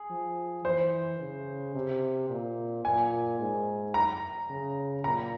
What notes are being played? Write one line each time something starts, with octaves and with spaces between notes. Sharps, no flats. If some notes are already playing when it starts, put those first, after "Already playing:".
Already playing: G#4
F3
E3 C5
C#3
C3
A#2
A#2 G#5
G#2
A#5
C#3
A#2 A#5